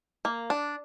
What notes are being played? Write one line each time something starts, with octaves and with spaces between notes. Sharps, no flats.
A#3
D4